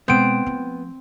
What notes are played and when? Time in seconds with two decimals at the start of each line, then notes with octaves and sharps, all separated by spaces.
0.08 B2 G#3 B3 C4 D7
0.46 F3 A3